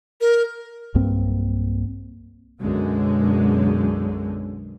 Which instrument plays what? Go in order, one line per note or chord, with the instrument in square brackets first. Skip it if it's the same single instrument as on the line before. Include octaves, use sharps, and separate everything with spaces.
[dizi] A#4
[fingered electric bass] B1 G2 A#3 C4
[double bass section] B1 F#2 D3 G#3